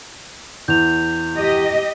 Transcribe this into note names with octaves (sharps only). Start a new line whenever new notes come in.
E2 G6 F7
G4 D#5